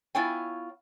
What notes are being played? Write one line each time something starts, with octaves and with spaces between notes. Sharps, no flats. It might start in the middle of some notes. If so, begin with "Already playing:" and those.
B3 E4 F4 C#5 G5 G#5